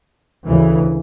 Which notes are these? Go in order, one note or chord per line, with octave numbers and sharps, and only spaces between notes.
D2 C#3 E3